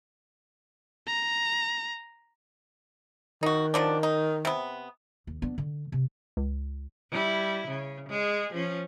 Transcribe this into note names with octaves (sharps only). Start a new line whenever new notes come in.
A#5
D#3 D#4 F#4
F3 F#3 D4
D#4
C3 B3
D#2
B3 D4
D3
C3
C#2
G3 E4
C#3
G#3 G#4
F3 C#4